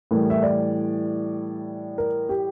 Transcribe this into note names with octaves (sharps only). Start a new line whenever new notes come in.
A2 E3 G3 A#4
E5
D5
A#4
G4